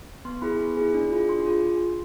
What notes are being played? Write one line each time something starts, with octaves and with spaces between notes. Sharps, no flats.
B3 C6
E4 G#4 B5
B3
E4 G#4
D4
F4 G#4
D4 C6
F4 G#4